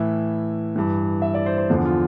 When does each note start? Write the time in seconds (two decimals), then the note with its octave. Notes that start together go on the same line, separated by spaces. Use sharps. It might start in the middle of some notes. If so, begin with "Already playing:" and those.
Already playing: A2 E3 E5
0.76 G2 E3
1.22 E5
1.34 D5
1.46 C5
1.58 C5
1.70 E2 D3 F3
1.85 F4